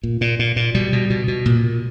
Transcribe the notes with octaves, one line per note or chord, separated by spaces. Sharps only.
A#2
A#2
A#2
A#2
B2 G3
B2
B2
B2
A#2
A#2